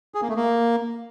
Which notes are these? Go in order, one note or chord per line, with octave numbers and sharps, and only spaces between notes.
G#4
A#3
A3
A#3